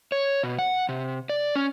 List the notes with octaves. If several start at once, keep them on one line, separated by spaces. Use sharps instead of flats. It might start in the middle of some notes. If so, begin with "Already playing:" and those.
C#5
B2
F#5
C3
D5
C#4